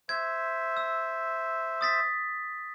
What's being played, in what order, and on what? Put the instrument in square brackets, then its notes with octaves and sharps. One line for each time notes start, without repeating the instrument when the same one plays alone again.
[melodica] C5 E5 [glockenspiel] G#6
[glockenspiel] E6
D#6 A6 B6